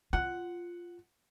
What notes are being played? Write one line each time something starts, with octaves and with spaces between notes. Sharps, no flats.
F4 F#5